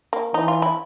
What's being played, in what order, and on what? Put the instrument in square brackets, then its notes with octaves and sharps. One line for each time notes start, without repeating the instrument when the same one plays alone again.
[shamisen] A#3
[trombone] E3 [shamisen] D#4
[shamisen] F4
E4